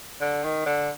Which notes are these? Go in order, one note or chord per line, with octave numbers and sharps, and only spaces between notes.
D3
D#3
D3